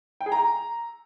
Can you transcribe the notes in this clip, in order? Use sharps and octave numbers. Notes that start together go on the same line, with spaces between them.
G5
G#4
A#5